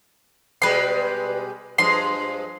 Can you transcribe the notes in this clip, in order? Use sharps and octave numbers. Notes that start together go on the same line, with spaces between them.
B2 G3 G#3 B4 C6
G2 F3 G#3 C6